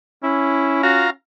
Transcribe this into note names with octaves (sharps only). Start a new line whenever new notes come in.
C#4 E4
F4 F#4 F5 A#5